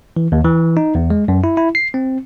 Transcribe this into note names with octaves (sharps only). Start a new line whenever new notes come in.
E3
D#2
E3
D#4
E2
G#3
F#2
E4
E4
C7
C4